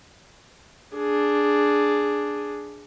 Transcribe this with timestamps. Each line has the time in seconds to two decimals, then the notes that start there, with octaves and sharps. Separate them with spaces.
0.96 D4 G#4